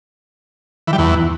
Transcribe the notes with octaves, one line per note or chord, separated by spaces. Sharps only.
E3
G3
E2